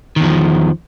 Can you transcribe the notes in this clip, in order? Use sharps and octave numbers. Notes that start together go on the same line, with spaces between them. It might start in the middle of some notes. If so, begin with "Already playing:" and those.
E2 D#3 F3